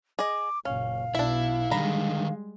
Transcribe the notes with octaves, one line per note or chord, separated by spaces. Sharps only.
G#4 D#5 D6
F#1 A#2 C#4 F5
B1 B2 D4 E4 E5
D3 D#3 G3 G#3 A#5 B5